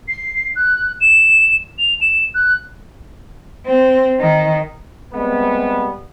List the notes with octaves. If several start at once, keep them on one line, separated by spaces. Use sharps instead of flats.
C7
F#6
E7
F7
E7
F#6
C4
D#3
C3 G3 G#3 B3